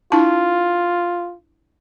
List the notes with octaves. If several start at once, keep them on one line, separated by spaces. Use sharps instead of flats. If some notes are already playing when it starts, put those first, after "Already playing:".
D4 E4 F4 A5